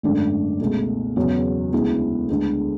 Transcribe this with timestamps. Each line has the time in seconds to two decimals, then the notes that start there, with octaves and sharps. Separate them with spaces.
0.03 G#1 F#2 D3 A3 D4
0.60 C#2 B2 A3
1.16 E2 C#3 F#3 B3
1.73 D2 C#3 G#3 B3 E4
2.29 D2 D3 G#3 B3